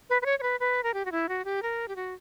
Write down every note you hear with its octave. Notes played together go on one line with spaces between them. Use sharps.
B4
B4
C#5
C#5
B4
B4
A#4
G4
F#4
E4
F#4
G4
A#4
G4
F#4